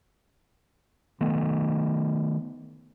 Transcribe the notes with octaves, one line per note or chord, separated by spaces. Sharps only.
D#3 A3 B3